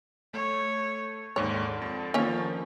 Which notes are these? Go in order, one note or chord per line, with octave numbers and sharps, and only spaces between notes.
A3 C#5
D#2 G#2 D3 G#3 C#5
F2 A5
D#3 F3 A#3 C#4